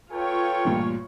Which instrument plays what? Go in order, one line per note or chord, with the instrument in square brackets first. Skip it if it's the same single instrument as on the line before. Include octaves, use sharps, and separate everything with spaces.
[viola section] F4 C#5 [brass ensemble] A4 B4 G5
[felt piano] A1 G2 A#2